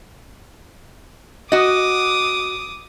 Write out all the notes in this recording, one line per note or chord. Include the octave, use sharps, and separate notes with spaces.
F#4 D#5 D6 D#6